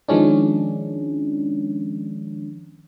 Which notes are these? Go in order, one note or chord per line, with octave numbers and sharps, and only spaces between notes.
D#3 F3 G#3 C#4 D4